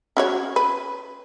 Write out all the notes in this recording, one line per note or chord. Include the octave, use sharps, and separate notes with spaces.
C#4 F#4 C#5
B4